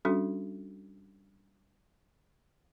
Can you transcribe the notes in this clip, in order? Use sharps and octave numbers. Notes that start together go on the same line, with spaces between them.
G3 C#4 D4 F#4 A4